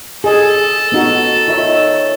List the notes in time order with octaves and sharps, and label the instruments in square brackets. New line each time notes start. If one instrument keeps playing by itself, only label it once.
[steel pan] G#4 D#5 [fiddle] A4
[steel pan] B3 D#4 F#4
[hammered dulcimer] D#3 C#5 [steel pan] F4 E5